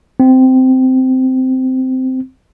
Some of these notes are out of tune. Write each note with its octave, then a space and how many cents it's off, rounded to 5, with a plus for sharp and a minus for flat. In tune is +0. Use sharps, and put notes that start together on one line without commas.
C4 -15